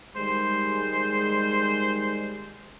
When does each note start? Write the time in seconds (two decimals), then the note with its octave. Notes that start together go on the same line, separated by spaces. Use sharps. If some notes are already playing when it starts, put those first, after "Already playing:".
0.17 D#3 G3 G#3 C5